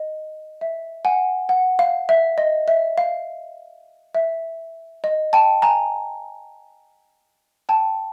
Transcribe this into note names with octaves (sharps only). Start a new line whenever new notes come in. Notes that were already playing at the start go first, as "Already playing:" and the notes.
Already playing: D#5
E5
F#5 G#5
F#5
F5
E5
D#5
E5
F5
E5
D#5
G5 A5
G#5 A#5
G5 A5